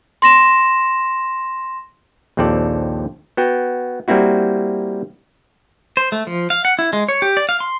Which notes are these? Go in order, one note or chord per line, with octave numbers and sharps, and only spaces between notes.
C6 A#6 E7
A#1 D#2 C4 F4 A4 D5
B3 F#4 G5
G3 A#3 C4 E4 F#4
C5
A3
F3
F5
F#5
E4
G#3
C#5
G4
D5
F5
C6